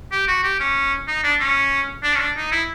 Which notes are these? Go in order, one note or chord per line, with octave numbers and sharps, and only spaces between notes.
G4
F#4
G4
C#4
D#4
D4
C#4
D4
C#4
D4
D#4
E4